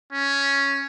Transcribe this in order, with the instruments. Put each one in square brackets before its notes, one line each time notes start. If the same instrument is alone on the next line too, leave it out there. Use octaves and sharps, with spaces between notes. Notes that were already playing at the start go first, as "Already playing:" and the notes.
[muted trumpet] C#4